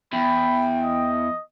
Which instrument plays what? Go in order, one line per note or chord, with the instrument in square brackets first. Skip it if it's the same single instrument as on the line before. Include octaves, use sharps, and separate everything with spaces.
[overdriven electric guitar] E2 [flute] G5 [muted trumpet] B5
[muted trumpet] D#5